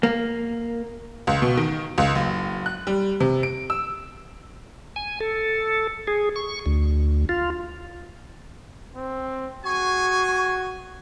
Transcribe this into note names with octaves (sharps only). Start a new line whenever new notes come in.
A#3
C#2
B2
D#3
C#2
F#1
F#6
G3
C3
D7
E6
G#5
A4
G#4
C#6
D2
F4
C4
F#4 G#4 G#5 C#6